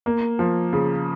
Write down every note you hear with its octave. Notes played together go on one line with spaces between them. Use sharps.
A#3
F3
C#3